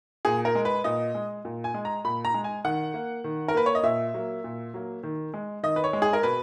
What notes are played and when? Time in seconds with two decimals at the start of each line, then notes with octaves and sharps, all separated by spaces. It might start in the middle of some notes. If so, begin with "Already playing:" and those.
0.25 A#2 G#4
0.45 A#4
0.55 G#3
0.65 B4
0.84 A#2 D#5
1.15 G#3
1.45 A#2
1.64 G#5
1.74 G#3
1.85 A#5
2.05 A#2 B5
2.25 A#5
2.34 G#3
2.44 G#5
2.65 D#3 F#5
2.94 A#3
3.24 D#3
3.48 A#4
3.55 A#3 B4
3.66 C#5
3.75 D#5
3.83 A#2 E5
4.14 F#3 A#3
4.44 A#2
4.74 F#3 A#3
5.03 D#3
5.34 G#3
5.63 D#3 D#5
5.76 B4
5.84 C#5
5.93 G#3
6.02 G#4
6.13 A#4
6.23 B2 B4